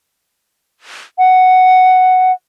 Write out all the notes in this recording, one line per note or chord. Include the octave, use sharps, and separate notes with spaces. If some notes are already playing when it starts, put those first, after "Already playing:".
F#5